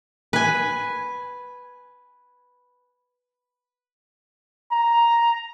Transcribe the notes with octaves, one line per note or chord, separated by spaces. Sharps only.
B4 G#5
A#5